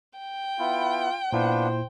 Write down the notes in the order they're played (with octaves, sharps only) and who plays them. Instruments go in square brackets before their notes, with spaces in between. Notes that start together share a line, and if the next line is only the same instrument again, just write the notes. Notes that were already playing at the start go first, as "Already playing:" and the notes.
[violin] G5
[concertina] B3 E4 [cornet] F4
[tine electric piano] A#2 E4 [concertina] B3 D4 F4 [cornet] C5